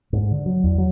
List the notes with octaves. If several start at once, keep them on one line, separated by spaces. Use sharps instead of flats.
G#2
D3
F#3
E2
F#3